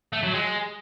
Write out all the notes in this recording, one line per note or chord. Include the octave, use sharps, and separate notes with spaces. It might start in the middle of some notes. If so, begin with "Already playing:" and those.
A3
F#3
G#3